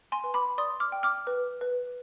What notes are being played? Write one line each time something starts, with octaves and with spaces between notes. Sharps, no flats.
G#5 C6
B4
B5 D6
D5 C6 D#6
D6 F6
G5
D6 F6
B4
B4